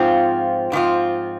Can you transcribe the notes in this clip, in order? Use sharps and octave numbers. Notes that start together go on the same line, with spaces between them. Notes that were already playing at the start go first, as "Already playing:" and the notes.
Already playing: G#2 F3 C4 F4
G#2 F3 C4 F4